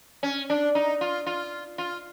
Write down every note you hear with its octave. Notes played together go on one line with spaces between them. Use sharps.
C#4
D4
D#4
F4
F4
F4